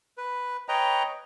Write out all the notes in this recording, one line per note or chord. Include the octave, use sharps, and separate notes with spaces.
B4
B4 C#5 D#5 G5 A#5